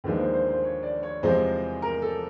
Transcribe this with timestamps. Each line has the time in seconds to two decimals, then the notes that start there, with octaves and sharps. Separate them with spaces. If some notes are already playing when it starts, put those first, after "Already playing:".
0.04 D#2 D3 F3 G#3 B4
0.19 C5
0.34 C5
0.48 C5
0.64 C#5
0.83 D5
1.03 C#5
1.23 E2 C3 F3 G#3 C5
1.82 A#4
2.02 A4